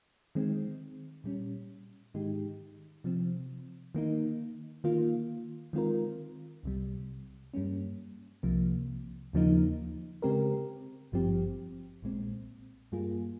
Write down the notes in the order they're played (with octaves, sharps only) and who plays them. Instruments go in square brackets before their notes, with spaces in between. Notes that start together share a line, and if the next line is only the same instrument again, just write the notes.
[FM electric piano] D#3 G#3 C4
A#2 G3 C#4
G#2 D#3 G#3 D#4 G4
C3 F3 C4
D#3 A#3 D#4
D#3 A#3 F4
D#3 G#3 C4 F4 A#4
C2 C3 G3
G2 G3 A#3 C#4
C2 C3 F3 A#3
D#2 C#3 F3 A#3 D#4
C#3 G#3 C4 G4 A#4
G#1 G2 F3 C4 G4
A#1 A#2 G#3 C4
G2 G3 A#3 F4 G#4